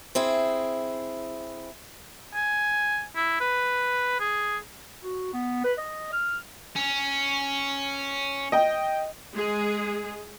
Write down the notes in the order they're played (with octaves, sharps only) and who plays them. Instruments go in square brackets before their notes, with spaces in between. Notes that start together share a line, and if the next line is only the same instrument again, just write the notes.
[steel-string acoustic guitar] C4 E4 G#4
[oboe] G#5
E4
B4
G#4
[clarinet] F#4
B3
B4
D#5
F6
[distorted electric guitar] C#4
[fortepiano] D#5 G5
[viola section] G#3 G#4